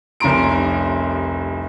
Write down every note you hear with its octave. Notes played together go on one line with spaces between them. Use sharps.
F1 C2 C#4 A#5 C6 D7